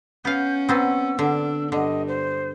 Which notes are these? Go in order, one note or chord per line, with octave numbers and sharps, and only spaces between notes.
B3 C#4 F5 G6
F#3 B3 C4 E6
D3 D4
G2 D3 D#5
C5